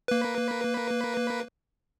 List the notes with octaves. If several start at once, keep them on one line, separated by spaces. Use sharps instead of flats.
A#3 B4